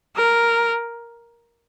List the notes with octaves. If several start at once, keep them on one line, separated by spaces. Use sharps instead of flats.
A#4